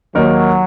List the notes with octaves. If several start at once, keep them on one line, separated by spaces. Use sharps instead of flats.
D#2 D#3 F#3 A#3 D#4 A#4